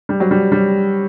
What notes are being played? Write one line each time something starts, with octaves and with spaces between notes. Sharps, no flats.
G3
F#3
G3
G3